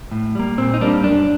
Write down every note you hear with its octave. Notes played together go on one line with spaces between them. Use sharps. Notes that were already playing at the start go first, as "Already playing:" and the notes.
A2
G3 A#3
A#2 C4
D#4
G3 A#3 D4
F#2 D4